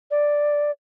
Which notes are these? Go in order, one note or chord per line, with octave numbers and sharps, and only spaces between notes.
D5